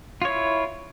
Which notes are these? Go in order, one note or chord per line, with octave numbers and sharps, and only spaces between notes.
E4 F4 C#5